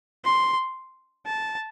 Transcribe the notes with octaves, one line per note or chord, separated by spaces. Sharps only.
C6
A5